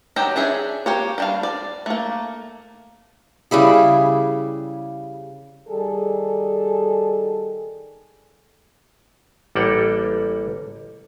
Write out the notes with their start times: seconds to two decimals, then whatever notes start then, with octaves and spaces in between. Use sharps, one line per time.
0.16 D#3 F#3 D4 G4 A#5
0.36 C#4 D4 G#4 E5
0.86 A#3 G4 C#5
1.18 G3 D4 F5
1.43 D5
1.86 A3 A#3
3.51 C#3 G3 E4 G#4
5.69 D#3 G3 G#4 A4
9.55 A1 G3 A#3 A4 F#5 G5